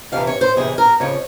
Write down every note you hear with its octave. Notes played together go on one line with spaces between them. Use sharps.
F2 C3 E3 F5
C#5
C5
F2 C3 E3 G#4
A#4
F2 C#3 F3 C#5